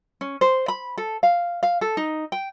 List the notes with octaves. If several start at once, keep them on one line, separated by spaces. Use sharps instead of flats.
C#4
C5
B5
A4
F5
F5
A4
D#4
G5